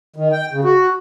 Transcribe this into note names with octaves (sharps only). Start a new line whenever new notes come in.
D#3
G5
C#3
F#4